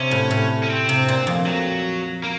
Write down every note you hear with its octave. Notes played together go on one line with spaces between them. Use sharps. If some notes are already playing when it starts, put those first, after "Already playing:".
Already playing: C3 C#4
A2
A2
C#4
C4
C3
A#2
F2
F#3
A#3